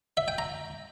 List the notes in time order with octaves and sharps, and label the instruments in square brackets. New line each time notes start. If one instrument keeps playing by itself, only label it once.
[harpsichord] E5
G5
A#5